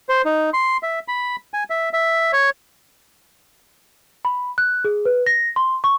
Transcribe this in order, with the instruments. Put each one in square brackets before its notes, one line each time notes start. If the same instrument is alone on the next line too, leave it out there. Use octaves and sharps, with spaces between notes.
[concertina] C5
D#4
C6
E5
B5
G#5
E5
E5
C#5
[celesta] B5
F#6
G#4
B4
A#6
C6
C#6